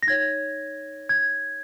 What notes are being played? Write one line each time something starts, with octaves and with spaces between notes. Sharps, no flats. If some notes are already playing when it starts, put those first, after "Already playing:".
A#6
D#4 C#5 G#6
G#6